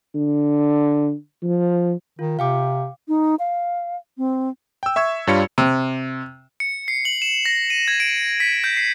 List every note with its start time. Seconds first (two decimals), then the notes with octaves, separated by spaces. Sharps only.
0.15 D3
1.43 F3
2.19 D#3 F4
2.39 C3 F5 G5 D6
3.08 D#4
3.39 F5
4.18 C4
4.83 G5 E6
4.96 E5 C#6 E6 G#6
5.27 G2 G3 F4 C#5 C#7
5.58 C3
6.60 C#7
6.88 C7
7.05 F#7
7.22 E7
7.46 A#6
7.70 D#7
7.88 G#6
8.00 D7
8.40 B6
8.64 G6
8.77 C7